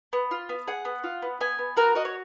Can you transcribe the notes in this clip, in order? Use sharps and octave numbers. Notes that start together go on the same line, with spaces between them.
B3
F4
B3
G#4 F#5
B3
F4
B3
B3 G#5
B3
F#4 A#4
F#4 D#5
C#5